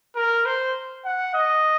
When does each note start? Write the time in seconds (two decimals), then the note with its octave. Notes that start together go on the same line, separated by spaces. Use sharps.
0.15 A#4
0.46 C5
1.05 F#5
1.34 D#5